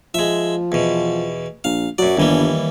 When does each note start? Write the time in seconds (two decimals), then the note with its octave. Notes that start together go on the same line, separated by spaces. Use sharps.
0.14 F3 G#3 E5
0.72 E2 B2
1.64 A#1 F5
1.98 F#2 F#3 D5
2.17 G1 D#2 E3 G3